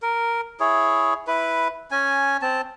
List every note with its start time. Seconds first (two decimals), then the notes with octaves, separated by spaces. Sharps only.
0.02 A#4
0.60 E4 G#4 C#5
1.27 E4 B4
1.91 C#4 G#5
2.42 C4 A5